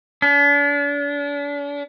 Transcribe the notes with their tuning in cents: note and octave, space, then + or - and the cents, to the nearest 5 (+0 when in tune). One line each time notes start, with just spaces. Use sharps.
D4 -40